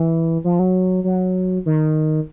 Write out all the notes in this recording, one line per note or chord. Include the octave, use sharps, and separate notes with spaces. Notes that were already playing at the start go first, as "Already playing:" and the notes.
Already playing: E3
F3
F#3
F#3
D#3